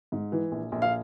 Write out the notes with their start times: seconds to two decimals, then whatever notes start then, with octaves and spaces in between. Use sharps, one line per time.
0.12 G#2
0.32 E3
0.52 A#1
0.72 A#1
0.82 F5